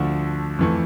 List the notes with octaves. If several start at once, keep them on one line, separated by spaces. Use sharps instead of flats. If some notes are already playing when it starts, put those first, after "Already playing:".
Already playing: D2 D3 F3 A3
F2 E3 A3